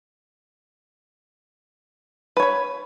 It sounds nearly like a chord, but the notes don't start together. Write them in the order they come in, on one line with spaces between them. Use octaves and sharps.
B4 C#5 B5